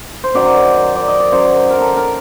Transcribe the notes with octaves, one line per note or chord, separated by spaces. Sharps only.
C5
F#2 D#3 F#3 D5
D5
D#5
D5
F#2 F#3 C5
A#4
A4
A#4